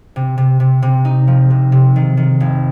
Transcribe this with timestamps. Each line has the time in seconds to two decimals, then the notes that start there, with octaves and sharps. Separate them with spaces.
0.16 C3
0.38 C3
0.60 C3
0.82 C3
1.05 D#4
1.27 F3
1.50 C3
1.72 C3
1.96 D#3
2.17 D#3
2.40 F1